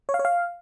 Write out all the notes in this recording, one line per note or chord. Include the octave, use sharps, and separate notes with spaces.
C#5
F5
C#5
F5